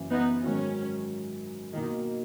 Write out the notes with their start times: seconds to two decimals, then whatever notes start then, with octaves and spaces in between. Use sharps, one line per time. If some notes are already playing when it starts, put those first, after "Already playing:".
Already playing: F#1 F#2 E3
0.11 B3 D#4
0.43 G#2 D#3 F#3 C#4
1.73 B2 D#3 A#3 D#4